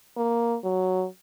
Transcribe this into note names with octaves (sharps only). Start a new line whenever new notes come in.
A#3
F#3